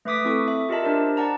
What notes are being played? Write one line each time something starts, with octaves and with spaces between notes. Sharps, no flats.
A3 B4 E5 D6 D#6 B6
C4 E4 A4 C#6 D#6
E5
F4 G4 A#4 D#5 E5 A5
D4 A#4 C5 D5
D5 F#5 A5 A#5